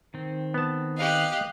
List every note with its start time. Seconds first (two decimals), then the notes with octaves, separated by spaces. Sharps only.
0.14 D#3 C4
0.54 B3 A5
0.97 G4 D#5 F5 F#6